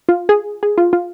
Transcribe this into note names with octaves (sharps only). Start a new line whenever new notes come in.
F4
G#4
G#4
F4
F4